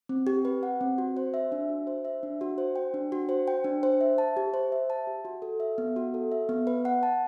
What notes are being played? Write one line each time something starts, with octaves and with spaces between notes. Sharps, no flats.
C4
G4
B4
F#5
C4
F#4
C5
E5
D4
F#4
C5
E5
D4
F#4
C5
G5
D4
F#4
C5
G5
D4
C5
E5
A5
G4
C5
E5
A5
G4
F#4
A4
E5
B3
F#4
A4
E5
B3
B4
F#5
A5